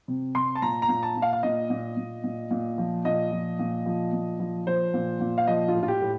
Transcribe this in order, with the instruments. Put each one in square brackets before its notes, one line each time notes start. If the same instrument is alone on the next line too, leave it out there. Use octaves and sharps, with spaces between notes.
[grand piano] C3
C3 C6
A5
A#2 A#5
A#5
A#2
A5
A#2
F5
F5
A#2 D#5
A#2
A#2
A#2
A#2
F3
A#2 D#5
F3
A#2
F3
A#2
F3
F3 C5
A#2
A#2
F5
F3 D#5
F4
A2
F4
G4
A2